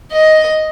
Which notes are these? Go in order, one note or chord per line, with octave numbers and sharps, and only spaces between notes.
D#5